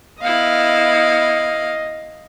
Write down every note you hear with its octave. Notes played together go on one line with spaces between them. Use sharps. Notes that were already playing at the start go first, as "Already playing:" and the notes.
B3 E4 D#5 F5